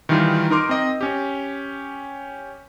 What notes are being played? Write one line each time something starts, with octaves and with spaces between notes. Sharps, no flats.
D#3 E3 G3 D#4 F4
D#4 A#4 C6 D6
C4 D#5
C#4 G4